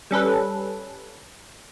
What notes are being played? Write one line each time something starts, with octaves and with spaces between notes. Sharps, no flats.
G3 C#4 A4 B4